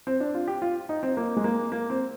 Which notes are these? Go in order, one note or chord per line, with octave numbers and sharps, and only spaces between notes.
C4
D4
F4
G4
F4
D#4
C4
A#3
G#3
A#3
A#3
C4